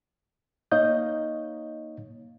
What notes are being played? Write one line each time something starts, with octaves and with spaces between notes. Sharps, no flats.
A#3 D#4 C#5 D#5 F5 G6